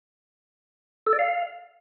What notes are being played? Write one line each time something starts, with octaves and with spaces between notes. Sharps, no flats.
A4
D5
F5